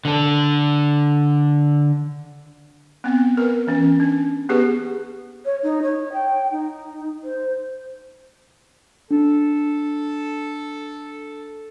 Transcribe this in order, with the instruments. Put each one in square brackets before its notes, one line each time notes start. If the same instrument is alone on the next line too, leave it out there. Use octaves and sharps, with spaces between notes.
[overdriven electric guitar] D3 A4
[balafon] B3 C4
A#4 B4
E3 C#4
D4
B3 G4 G#4 B4
[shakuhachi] C#5
D#4
C#5
G5
D#4
C5
[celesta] D4 [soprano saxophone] A4